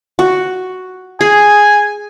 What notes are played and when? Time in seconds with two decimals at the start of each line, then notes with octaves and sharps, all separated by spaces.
0.19 F#4
1.21 G#4 G#5